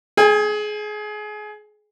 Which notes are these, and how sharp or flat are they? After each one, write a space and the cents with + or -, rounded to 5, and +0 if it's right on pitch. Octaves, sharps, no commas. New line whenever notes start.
G#4 +25 G#5 -35